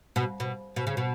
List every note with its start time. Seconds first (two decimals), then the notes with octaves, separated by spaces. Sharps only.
0.16 B2
0.40 B2
0.76 B2
0.87 C#3
0.97 B2